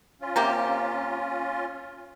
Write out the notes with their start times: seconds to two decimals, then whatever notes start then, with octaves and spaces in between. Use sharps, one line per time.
0.21 C#4 F4
0.36 C3 A#3 G4